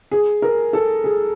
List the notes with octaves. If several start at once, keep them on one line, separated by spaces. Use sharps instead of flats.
G#4
A#4
A4
G#4